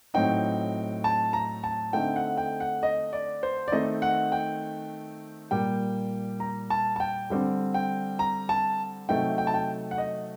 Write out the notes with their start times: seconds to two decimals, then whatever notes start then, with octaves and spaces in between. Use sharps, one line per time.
0.14 A2 F#3 C4 D#4 G5
1.04 A5
1.33 A#5
1.64 A5
1.93 D3 A3 C4 D#4 G5
2.16 F#5
2.38 G5
2.60 F#5
2.83 D#5
3.13 D5
3.43 C5
3.68 D5
3.72 D#3 A3 C4 D#4 D#5
4.02 F#5
4.32 G5
5.51 A#2 G3 A#3 G5
6.40 A#5
6.70 A5
6.96 A5
7.00 G5
7.30 D3 G3 C4
7.74 G5
8.19 A#5
8.49 A5
9.09 C3 F#3 A3 C4 D#4 G5
9.38 G5
9.47 A5
9.54 G5
9.91 F#5
9.98 D#5